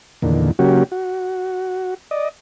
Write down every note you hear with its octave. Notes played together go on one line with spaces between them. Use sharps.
E2 A#2 D3 D#3
C#3 F#3 A#3 C#4 F#4 G4
F#4
D5 D#5